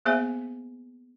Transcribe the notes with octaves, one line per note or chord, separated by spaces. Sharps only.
A#3 B3 G#4 C5 E5 G#5